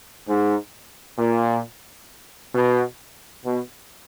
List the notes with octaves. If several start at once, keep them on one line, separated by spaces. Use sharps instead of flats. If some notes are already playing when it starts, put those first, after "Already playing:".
G#2
A#2
B2
B2